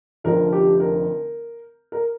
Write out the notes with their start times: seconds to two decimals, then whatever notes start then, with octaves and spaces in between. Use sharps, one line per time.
0.24 F1 F2 D3 F3 A#4
0.53 G4
0.80 A#4
1.92 A#4